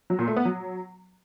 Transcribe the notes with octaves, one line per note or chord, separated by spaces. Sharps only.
F#3
A#2
A3
B3
F#3